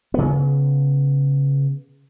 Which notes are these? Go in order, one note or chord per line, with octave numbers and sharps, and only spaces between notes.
C#3 B3